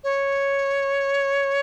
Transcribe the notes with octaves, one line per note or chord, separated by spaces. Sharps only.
C#5